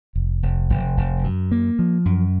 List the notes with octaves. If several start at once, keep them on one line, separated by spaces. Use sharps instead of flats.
F1
F1
F1
F1
F#2
A#3
F3
F#2